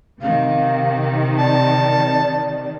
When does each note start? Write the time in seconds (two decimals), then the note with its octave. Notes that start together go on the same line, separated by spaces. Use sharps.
0.22 C3 D#3 F5
1.39 D5 A5